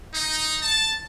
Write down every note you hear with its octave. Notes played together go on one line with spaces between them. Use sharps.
D#4
A5